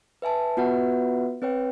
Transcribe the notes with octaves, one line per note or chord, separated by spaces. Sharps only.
B4 E5 G#5 A5
B3 F4 F#4 B4 E5 F#5
C4 B4 C#5 G5